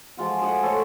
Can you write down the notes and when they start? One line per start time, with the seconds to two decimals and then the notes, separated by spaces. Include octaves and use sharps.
0.17 F3 G#3 F4 F#4
0.42 G#4 D#5 F#5 G#5
0.62 A3 A4 C5 C#5